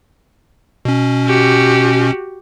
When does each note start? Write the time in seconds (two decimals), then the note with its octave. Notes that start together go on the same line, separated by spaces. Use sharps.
0.85 B2 C#4
1.27 F#4 G4